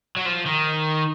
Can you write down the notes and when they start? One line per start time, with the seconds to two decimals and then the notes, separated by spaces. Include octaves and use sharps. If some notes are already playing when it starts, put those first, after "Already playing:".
0.17 F#3
0.26 F3
0.46 D#3